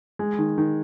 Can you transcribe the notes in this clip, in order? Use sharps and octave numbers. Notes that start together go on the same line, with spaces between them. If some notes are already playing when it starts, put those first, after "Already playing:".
G#3
D#3
D#3